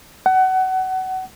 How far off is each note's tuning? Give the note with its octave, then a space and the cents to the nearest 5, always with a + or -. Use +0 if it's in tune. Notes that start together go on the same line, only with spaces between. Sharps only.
F#5 +25